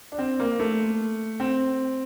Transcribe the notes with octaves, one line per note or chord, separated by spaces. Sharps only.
D4
C4
A#3
A3
C4